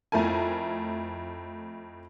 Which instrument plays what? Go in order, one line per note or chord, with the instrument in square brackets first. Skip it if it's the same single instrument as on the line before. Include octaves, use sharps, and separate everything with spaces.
[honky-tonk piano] F2 A3 E4 A#4 G#5